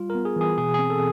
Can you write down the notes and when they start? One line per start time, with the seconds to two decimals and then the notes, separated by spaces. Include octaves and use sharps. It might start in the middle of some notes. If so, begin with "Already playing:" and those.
Already playing: G3 F4
0.10 A#4
0.15 B3
0.25 G#4
0.36 E3 G#4
0.58 B2 G#4
0.74 C4 G#4
0.90 A4